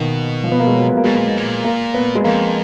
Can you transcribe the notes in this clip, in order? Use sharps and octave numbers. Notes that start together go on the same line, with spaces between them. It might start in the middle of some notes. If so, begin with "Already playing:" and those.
Already playing: B2 D#3 A#3 B3
F3
B3
A#3
G#3
F#3
B3
A#3
B2 G#3
A#2
G#2
A#2
A#3
B3
G#3
F2 A#3